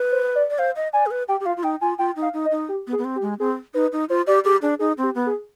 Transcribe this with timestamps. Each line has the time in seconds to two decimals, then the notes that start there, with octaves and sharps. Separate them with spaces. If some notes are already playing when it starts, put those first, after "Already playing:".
Already playing: B4
0.12 C5
0.35 D5
0.50 D5
0.59 C5 F5
0.76 D#5
0.93 D5 G#5
1.06 G#4
1.11 B4
1.28 G4 G5
1.40 G4
1.45 F4 F5
1.57 F4
1.63 D#4 G5
1.81 F4 G#5
1.99 F4 G5
2.16 D#4
2.22 F5
2.34 D#4
2.45 D#5
2.51 D#4
2.69 G4
2.87 B3
2.93 G#4
2.98 B3
3.04 C4
3.16 G4
3.22 G#3
3.40 C4 G#4
3.74 D#4 B4
3.93 D#4
4.09 F4 C5
4.27 G4 D5
4.44 G4 G#4
4.62 D4 G#4
4.79 D#4 G#4
4.98 C4
5.03 G4
5.15 B3
5.26 G#4